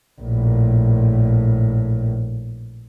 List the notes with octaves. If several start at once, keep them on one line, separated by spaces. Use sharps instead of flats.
A#1 A2